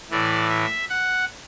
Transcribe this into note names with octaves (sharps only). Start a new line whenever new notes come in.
A2 E3 D5
E5
F#5